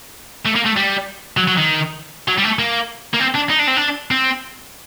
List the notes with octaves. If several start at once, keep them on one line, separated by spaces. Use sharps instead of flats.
A3
A#3
A3
G3
F#3
F#3
D#3
F#3
G3
A3
A#3
A#3
C4
D4
D#4
D4
C4
D4
C4